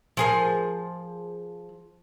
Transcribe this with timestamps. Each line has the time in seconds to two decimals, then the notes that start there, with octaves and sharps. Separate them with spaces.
0.17 F3 G#4 A#4